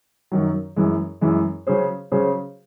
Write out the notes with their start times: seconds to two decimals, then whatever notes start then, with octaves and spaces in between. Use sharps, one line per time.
0.32 F#2 D#3 F#3
0.76 F#2 E3 G#3
1.21 F#2 E3 G#3
1.67 C#3 F#3 C#4 G#4 C5
2.12 C#3 F#3 C#4 G#4 C5